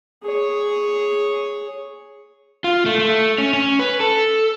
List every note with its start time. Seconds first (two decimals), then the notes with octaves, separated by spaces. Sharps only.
0.23 G#4 C#5
2.64 F4
2.86 A3
2.99 A3
3.38 C#4
3.54 C#4
3.79 B4
4.00 A4